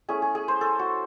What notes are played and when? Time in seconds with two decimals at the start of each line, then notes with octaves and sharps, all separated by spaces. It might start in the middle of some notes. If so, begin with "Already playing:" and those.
0.09 A3 C#4 E4 G#4
0.22 G#4
0.35 G#4
0.48 C5
0.61 A4
0.79 F#4